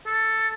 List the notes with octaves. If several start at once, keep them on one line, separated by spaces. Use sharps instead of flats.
A4